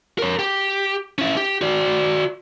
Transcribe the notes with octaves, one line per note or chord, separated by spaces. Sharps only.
A#4 C#5
G4
C#4 E4
G4
F#4 D5